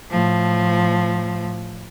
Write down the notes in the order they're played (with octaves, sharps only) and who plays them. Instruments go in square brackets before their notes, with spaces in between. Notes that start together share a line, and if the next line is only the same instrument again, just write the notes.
[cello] A2 F3